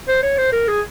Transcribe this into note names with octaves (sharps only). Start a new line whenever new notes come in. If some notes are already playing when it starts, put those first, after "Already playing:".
C5
C#5
C5
A#4
G#4